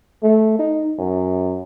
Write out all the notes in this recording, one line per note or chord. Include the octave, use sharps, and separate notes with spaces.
A3
D#4
F#2